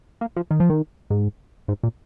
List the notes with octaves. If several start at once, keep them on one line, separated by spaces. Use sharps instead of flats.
A#3
F3
D#3
F3
D#3
G#2
G#2
A#2